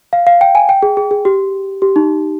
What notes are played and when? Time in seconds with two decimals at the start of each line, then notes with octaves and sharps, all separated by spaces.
0.13 F5
0.27 F5
0.41 G5
0.55 G#5
0.69 G5
0.83 G#4
0.97 G#4
1.11 G#4
1.25 G4
1.82 G4
1.96 D#4